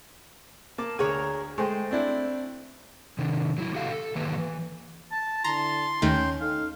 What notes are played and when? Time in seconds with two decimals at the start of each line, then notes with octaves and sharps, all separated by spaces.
0.78 A#3 A5 D6
0.99 D2 G#4 A#4 C#5
1.58 G#3 A3 C5 G5
1.91 C4 D4 E4
3.18 C3 D#3 D4
3.58 F#3 E4
3.75 F#4 G4 A4 F5
3.91 A4
4.15 D#3 E3 A#3 G4 B4
4.38 E3
5.11 A5
5.44 D3 E4 A5 A#5 C6
6.02 D#2 D#3 A3 C#4 G5
6.41 D#4 A4 F5